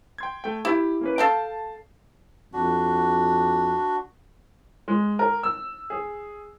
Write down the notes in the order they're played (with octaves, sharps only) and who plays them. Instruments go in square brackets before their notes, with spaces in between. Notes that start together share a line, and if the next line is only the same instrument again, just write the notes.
[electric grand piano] G5 C6 G#6
A3 G5
[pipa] E4 [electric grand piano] G4
[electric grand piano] A#3 C#4 B4
[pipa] A4 F5 G5 [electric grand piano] A5 C7
[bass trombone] F2 [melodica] D4 F#4
[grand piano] G#3
A#4
E6
G#4